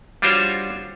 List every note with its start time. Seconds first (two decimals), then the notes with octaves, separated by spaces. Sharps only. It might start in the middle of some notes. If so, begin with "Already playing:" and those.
0.22 G3 D4 F4 F#4 C5 C#5